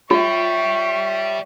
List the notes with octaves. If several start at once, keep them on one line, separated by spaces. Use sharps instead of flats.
G3 F4 C#5 E5 C#6